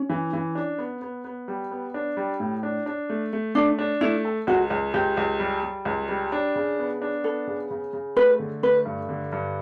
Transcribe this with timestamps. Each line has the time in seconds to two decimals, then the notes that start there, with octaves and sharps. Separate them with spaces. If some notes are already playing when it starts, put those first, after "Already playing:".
Already playing: C#4
0.10 E3
0.33 E3
0.55 D4
0.78 B3
1.02 B3
1.25 B3
1.48 G3
1.71 B3
1.94 D4
2.17 G3
2.40 A2
2.63 D4
2.86 D4
3.10 A3
3.33 A3
3.55 A3 D4
3.79 D4
4.01 A3 E4
4.25 A4
4.47 C#2 F#4
4.70 C#2
4.94 C#2 G4
5.17 C#2
5.40 G3
5.63 G3
5.85 C#2
6.09 G3
6.32 D4
6.56 C#3
6.79 B3
7.02 D4
7.24 B3 A4
7.47 C#3
7.71 C#3
7.93 C#3
8.17 A3 B4
8.40 D3
8.63 A3 B4
8.85 G2
9.09 D3
9.32 G2